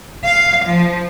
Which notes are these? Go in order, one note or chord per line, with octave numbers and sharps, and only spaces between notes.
F5
F3